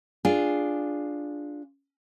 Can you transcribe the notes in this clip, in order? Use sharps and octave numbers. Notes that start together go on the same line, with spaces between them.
D4 F4 G#4